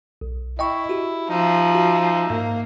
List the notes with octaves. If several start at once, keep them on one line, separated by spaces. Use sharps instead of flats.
B1
E4 D#5 G5 C#6
F#4 G4
F3 D#4 E5
F#4
G#2 A#3